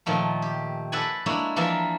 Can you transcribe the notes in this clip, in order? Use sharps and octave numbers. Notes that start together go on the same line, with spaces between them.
A#2 D#3 F3 A3
G4
A4 B4 D5 F#5 G#5
G#3 A#3 D4 E4 C#5
E3 F3 A#3 F4 D5 E5